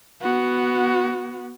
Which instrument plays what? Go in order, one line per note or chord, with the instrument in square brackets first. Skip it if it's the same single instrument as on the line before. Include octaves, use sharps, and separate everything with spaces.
[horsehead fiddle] B3 F#4